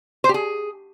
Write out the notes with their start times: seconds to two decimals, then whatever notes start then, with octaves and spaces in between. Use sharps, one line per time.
0.24 C5
0.29 G4
0.34 G#4